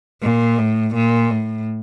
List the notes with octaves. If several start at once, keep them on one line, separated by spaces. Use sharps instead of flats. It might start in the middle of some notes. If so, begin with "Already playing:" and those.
A#2
A2
A#2
A2